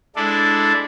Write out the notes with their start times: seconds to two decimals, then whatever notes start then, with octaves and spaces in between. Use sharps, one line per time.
0.16 G#3 D4 E4 A4 D5